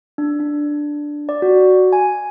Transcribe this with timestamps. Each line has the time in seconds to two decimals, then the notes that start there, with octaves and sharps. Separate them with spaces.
0.18 D4
0.40 D4
1.29 D5
1.42 F#4
1.93 G#5